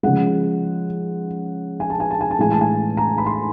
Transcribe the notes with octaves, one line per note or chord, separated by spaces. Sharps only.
C#3 F3 G#3 F#5
G#5
A5
G#5
A5
G#5
A5
A2 E3 G#3 G#5
A5
G#5
A#5
B5
C6